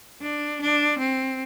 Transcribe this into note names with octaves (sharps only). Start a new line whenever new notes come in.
D4
D4
C4